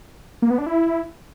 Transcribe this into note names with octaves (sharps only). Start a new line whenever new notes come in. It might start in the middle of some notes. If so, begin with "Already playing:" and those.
A#3
B3
D4
E4